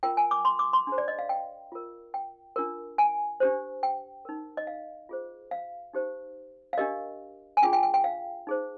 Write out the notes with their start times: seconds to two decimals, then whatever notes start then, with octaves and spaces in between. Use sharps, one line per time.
0.03 F4 A#4 G5
0.17 G#5
0.31 D6
0.45 C6
0.59 D6
0.73 C6
0.87 D4 G#4 C5
0.98 D5
1.08 D#5
1.19 F5
1.29 G5
1.72 F4 A#4
2.14 G5
2.56 D4 F4 A#4
2.98 G#5
3.40 D4 G4 C5
3.83 G5
4.25 D#4 A#4
4.57 D#5
4.67 F5
5.09 F4 G#4 C5
5.51 F5
5.93 D#4 G4 C5
6.73 F5
6.77 D4 G4 A#4 D#5
7.57 G#5
7.62 D4 F4 G#4 G5
7.73 G5
7.83 G5
7.94 G5
8.04 F5
8.47 D#4 G#4 C5